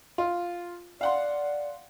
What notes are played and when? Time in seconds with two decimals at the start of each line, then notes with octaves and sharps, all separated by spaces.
0.18 F4
1.01 D5 F5 F#5 C6